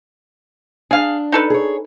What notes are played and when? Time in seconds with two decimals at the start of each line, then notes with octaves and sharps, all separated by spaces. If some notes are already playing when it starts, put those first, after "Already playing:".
0.91 D4 G#4 F5
1.32 D#4 A4 B4
1.50 G#4 C#5